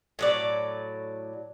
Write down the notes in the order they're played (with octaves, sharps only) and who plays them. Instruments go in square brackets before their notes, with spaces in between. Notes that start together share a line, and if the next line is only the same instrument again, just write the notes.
[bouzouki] A2 F#3 D5